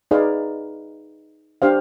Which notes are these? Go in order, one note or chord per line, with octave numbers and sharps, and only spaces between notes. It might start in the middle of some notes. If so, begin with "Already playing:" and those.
D#4 G#4 B4 D5 F5
D4 G4 C5 F5